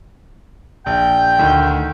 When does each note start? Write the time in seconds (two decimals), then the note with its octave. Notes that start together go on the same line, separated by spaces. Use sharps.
0.86 A#1 G5
1.39 D2 D#3